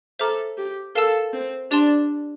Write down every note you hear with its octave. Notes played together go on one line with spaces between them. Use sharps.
A4 C5 E5 A#5 D6 F6
G4
A4 A#4 F5 A5 E6
C4
D4 G4 D5 A5 C6